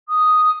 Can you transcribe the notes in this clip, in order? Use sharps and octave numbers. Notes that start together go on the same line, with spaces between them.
D#6